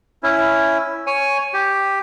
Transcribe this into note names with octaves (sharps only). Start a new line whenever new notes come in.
C#4 E4
C#5 G#5
G4